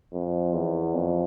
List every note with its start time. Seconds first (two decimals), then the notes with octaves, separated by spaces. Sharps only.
0.13 F2
0.54 E2
0.95 F2